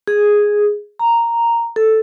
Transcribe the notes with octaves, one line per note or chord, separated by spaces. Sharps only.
G#4
A#5
A4